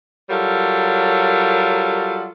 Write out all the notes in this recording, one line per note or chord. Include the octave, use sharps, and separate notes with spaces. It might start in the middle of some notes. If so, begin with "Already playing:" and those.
F#3 G3 F4 A4 A#4 C#5